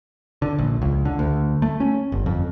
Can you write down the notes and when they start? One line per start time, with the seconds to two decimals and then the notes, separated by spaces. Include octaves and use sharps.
0.42 D3
0.59 A#1
0.82 C#2
1.05 D3
1.19 D2
1.62 A3
1.80 C#4
2.12 G1
2.26 F2